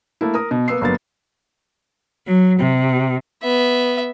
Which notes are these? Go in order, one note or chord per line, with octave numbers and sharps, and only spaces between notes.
A3 A#3 E4
A#4 D#6
B2
A#3 B3 E6 C7
G1 F#3 A#3 B3 A6
F#3
C3
B3 E5